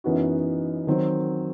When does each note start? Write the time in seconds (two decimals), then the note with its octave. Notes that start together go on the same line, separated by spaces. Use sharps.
0.04 F#2 E3 B3 D#4 F#4
0.87 D#3 F#3 C4